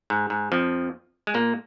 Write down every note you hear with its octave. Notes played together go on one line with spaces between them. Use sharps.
G#2
G#2
F2 F3
G#3
A#2 A#3